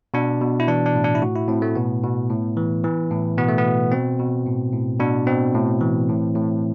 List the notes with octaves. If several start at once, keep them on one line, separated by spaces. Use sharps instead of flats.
B2 D4
B2
E4
E3 D4
D4
A2
D4
E4
A2 F#4
E4
A2 C4
A3
B2 B3
B2
A2
E3
E3
A2
B2 B3
A3
B3
B2
B2 C4
B2
A2
A2
B2 D4
B2 C4
A2
E3
A2
A2